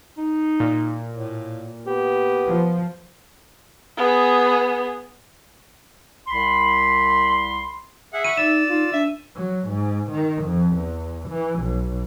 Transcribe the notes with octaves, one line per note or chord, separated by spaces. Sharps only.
D#4
A#2
A2
B3 G4
F3
B3 G#4
C2 B5 C6
G#4 E5 F#5
F#5 B5 C#6 D#7
D#4 D5 E6 E7
D#4 F4
D4 E5
F#3
G#2
D#3
F2
E2
E3
B1